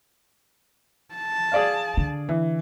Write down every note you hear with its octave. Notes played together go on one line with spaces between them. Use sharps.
A5
G#4 D5 F5
D3
E3